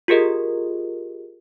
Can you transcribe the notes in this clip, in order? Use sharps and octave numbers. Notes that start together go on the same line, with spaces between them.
F4 G4 G#4 A#4 D#5